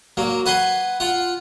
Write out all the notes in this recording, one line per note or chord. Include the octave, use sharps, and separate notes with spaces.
F#3 A#3
B4 F#5 G#5 C6
F4 F#5